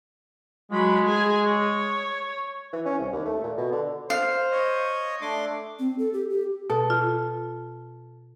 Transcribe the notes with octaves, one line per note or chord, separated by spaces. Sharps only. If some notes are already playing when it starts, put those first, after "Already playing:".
F#3 G#3 B5
G#4 G#5
C#5
E3
C#4
C2
D#2
A3
A#2
B2
D3
C5 F5
C#5 D#5
A3 D4 C6 D6
C4
A4
G4
G4
B2 A4
F4